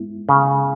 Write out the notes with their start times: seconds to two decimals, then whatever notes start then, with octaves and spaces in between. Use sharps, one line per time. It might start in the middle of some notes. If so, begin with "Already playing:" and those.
Already playing: G#3 B3 E4
0.29 C#3